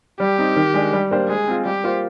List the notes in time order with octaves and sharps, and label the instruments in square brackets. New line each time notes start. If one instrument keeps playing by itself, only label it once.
[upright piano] G3 [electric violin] G4
[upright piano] C4 D#4
D#3
G#3 D4
G3
A#3 D4 G4 C5
[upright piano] G#3 [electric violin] G#4
[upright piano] C4 F4
[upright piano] G3 [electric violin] G4
[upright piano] A#3 F4 C5